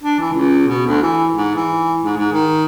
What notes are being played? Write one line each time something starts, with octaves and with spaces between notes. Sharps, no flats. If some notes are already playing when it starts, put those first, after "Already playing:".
D4
E3
C#2
B2
D2
E3
G#2
E3
G#2
G#2
D#3